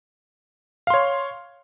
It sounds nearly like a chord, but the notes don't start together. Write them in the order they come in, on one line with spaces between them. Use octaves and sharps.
F5 C6 C#5